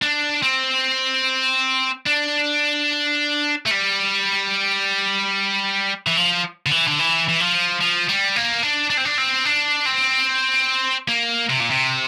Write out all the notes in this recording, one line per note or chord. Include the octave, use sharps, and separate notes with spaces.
D4
C4
D4
A3
G3
E3
F3
D3
E3
D3
E3
E3
F3
F3
G3
A#3
D4
D4
C4
D4
C4
D4
C4
A#3
C3
A#2
C3